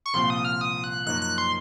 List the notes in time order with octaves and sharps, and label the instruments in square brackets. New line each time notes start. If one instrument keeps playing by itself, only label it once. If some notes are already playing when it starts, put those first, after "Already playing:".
[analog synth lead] C#6
[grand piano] C2 A#2 F3 C4 F4 [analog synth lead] C6
[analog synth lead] D#6
F6
D#6
F#6
[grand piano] F#2 F3 A#3 D#4 [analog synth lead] F#6
[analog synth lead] F#6
C6